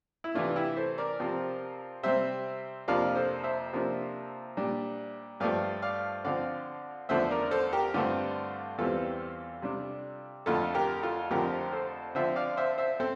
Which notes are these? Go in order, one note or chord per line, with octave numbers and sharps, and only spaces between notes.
E4
C3 E3 A3 D4 F4
E4 G4
A4 C5
A#4 D5
C3 F3 C4
C3 G3 C4 C5 E5
F2 C3 F3 A#3 D4 D5 F5
A4 C5
C5 E5
C3 F3 A#3 D4
A#2 G3 D4
G2 F3 A3 D5 F5
D5 F5
D3 F3 C4 D5 F5
E2 D3 F3 A3 D4 C5 E5
A#4 D5
A4 C5
G4 A#4
G2 D3 A3 C4 D4 F4
E2 E3 G3 C4 F4 A4
C3 G3 D4
F2 D3 A3 F4 A4
G4 A#4
F4 A4
F2 D3 F3 A3 C4 G4 A#4
A4 C5
D3 F3 C4 C5 E5
D5 F5
C5 E5
C5 E5
C4 A4 C5